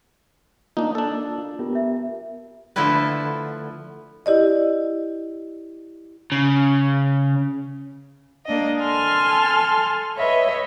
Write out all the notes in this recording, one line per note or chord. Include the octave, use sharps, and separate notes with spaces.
A#3 D4 D#4 F4
D4 A4
F4
B3 F4 G4 A#4
F4 E5
D3 F3 A3 E4 A4 B4
E4 G4 D5 D#5
C#3
A#3 D4 D#5
A4 G#5 A5 C6 F6
B4 C#5 D#5 E5